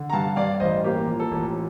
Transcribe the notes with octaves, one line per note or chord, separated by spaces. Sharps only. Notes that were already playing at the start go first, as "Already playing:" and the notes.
Already playing: D3
A#5
G2 F5 A5
G2 D5 F5
F5
A1 C5 D#5
A#3 G4
F3
A4
A1